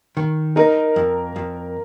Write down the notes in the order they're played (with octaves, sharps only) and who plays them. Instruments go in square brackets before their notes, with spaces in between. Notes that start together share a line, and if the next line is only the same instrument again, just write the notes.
[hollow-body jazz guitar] D#3
[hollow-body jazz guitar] D#4 [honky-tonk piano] A#4
[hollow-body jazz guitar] F2
F2